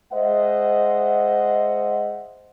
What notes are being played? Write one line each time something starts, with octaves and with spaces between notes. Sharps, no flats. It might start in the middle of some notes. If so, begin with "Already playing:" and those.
G#3 C5 D#5 E5 F#5